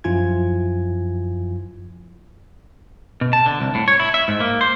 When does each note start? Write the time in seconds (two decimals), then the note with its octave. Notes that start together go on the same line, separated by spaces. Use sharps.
0.04 F#2 F3 E4 F4 G#5 G#6
3.21 B2
3.33 A5
3.46 D3
3.60 C2
3.75 A2
3.88 C#5
4.00 E4
4.14 E5
4.28 G#2
4.40 A#3
4.61 C5